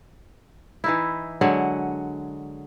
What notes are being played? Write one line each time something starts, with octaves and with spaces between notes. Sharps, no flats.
E3 D#4 E4
D3 F#3 G#3 F#5